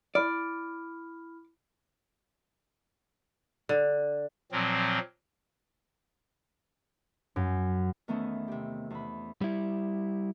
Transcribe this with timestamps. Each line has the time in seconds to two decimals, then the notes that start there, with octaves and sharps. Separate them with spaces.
0.15 E4 D5 B5 F6
3.69 D3
4.52 A#2 F3 F#3 C4
7.36 F#2
8.08 E2 D#3 A3 B3 C#4 E4
8.48 C3 G4
8.90 E2 B5
9.41 G3 E4